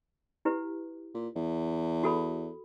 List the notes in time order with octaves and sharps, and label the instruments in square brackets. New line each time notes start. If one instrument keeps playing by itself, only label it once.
[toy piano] E4 G4 B4
[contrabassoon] A#2
E2
[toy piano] F#4 A4 B5